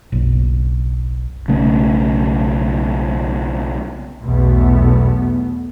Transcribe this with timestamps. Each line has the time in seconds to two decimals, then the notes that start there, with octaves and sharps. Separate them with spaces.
0.12 F#1 B1
1.48 B1 C#3 A3
4.22 B1 E2 B2 A3 B3